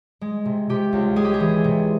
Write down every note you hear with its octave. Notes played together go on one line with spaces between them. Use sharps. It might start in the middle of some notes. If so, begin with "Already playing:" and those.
G#3
C3
C3 G4
C#2
G#3 G#4
G4
G#4
E3
C3